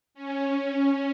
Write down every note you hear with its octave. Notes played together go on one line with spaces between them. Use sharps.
C#4
C#4